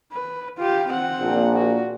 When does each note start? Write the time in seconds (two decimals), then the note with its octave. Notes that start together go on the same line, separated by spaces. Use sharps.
0.13 B4
0.58 F4 G4
0.89 C4 F#5
1.20 A#1 A#2
1.55 F#4